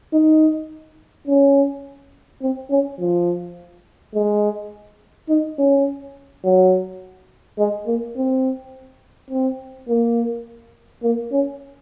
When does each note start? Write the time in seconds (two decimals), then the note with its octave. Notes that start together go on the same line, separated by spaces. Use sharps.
0.13 D#4
1.27 C#4
2.42 C4
2.70 C#4
2.99 F3
4.15 G#3
5.29 D#4
5.58 C#4
6.45 F#3
7.59 G#3
7.87 A#3
8.17 C4
9.31 C4
9.89 A#3
11.03 A#3
11.32 C#4